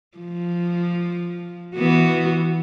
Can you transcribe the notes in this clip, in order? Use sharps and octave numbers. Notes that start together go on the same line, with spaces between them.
F3
E3 B3 F#4